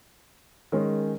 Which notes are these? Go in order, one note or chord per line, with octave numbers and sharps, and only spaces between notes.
D#3 G#3 C#4